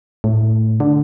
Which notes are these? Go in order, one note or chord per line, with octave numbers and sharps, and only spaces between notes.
A2
D3